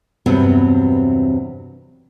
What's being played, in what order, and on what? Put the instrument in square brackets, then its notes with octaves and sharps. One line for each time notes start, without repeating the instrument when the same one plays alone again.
[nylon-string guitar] E2 G2 C3 F#3 B3 C4